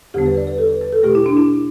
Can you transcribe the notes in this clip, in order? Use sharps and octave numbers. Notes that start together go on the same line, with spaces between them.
E2 D3 G3 B3 G4
B4
D5
B4
A4
B4
B4
A4
B2 A3 G4
E4
D4
E4